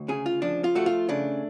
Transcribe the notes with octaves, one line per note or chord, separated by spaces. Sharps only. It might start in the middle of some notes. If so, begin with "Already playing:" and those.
Already playing: D2
C#3 G#4
F4
F3 D4
F4
A3 F#4
F4
C#3 D4